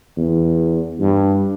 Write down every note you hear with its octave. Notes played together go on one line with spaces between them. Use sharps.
E2
G2